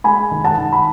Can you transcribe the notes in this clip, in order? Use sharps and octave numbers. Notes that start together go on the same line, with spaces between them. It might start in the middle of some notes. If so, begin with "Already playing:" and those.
G#3 G#5 B5
D#3
F#5 A5
D#3
B5